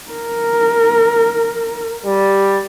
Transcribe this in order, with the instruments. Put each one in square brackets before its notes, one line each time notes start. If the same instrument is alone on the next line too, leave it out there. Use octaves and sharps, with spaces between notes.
[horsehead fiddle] A#4
[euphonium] G3